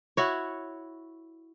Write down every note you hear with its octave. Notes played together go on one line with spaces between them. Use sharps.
E4 F#4 C#5